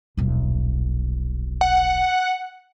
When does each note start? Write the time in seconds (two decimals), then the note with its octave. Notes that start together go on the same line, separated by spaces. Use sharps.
0.17 D#1 B1
1.61 F#5